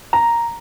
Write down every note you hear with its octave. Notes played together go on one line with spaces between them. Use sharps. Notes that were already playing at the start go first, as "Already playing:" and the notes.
A#5